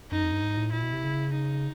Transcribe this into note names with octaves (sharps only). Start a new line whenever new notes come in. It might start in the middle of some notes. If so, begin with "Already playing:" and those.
F#2 D#4
F2
G2
G#2
A2
A#2 E4
B2
C3
C#3
D#4